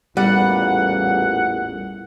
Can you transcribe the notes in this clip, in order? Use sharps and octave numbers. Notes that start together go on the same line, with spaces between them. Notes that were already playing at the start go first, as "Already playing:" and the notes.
A1 E2 A#2 G3 F#5